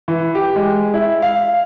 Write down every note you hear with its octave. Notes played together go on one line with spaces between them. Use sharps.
E3
G4
G#3
E4
F5